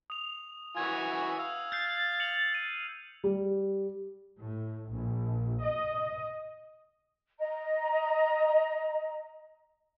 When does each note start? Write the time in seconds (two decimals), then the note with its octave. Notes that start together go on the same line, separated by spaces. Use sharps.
0.10 D#6 F7
0.77 E3 F#4 G#5 G#6
1.39 F5 E6
1.72 F6 G6 A6 C7
2.20 C#7 F7 F#7
2.55 D#7
3.24 G3
4.40 A2
4.90 A#1
5.61 D#5
7.39 D#5 A#5